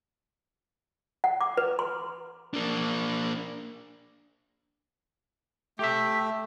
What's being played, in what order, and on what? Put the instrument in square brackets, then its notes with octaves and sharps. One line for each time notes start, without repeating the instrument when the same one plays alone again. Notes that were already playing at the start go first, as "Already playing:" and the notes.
[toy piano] F#5
D6
B4
C6
[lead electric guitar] A#3 D4
[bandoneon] A3 [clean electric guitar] G4 E5